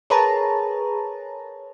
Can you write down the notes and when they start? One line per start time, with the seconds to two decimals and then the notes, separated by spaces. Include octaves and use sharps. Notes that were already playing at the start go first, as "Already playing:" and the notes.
0.10 G#4 A#4 B4 C#5 A5 A#5